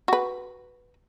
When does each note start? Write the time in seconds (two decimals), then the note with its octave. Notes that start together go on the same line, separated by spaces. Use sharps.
0.08 F#4 B4